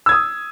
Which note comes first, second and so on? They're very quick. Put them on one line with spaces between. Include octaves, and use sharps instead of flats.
E6 G#6 D#6